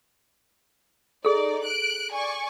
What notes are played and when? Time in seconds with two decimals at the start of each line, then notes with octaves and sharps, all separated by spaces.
1.25 D#4 G#4 A4 D5
1.64 F#6 D7
2.12 D5 G#5 C#6